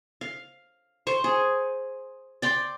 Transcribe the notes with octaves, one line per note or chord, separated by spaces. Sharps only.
F5
C5 C#6
G#4
D5 G5 C6